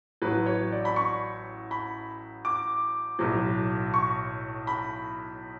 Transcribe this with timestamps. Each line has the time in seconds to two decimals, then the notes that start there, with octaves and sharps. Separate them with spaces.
0.22 A1 A2 F#3 B4
0.46 C#5
0.72 D5
0.85 B5
0.96 C#6
1.71 B5
2.45 D6
3.19 B1 A2 F#3
3.94 C#6
4.67 B5